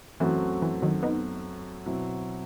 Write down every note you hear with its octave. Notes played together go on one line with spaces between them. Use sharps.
F#2 E3 F#3 A3 C4 F#4
E3
D#3 F#3
B3 D#4
B2 F#3 C4 E4